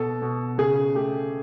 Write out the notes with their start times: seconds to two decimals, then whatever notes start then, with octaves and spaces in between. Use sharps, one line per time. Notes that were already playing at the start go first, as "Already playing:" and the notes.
Already playing: B2 A4
0.22 B2
0.58 C#3 G#4
0.95 A3 G4